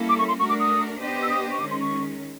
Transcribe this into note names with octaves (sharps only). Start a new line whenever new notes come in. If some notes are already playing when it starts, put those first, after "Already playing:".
Already playing: G3 A#3 C#4 E4 A4
D6
C#6
C6
A3 D4 F#4 A#4 C#6
D6
D#6
B3 D4 G4 C5 D#5
E6
D#6
C#6
D#3 G#3 C#4 D6
C6
C#6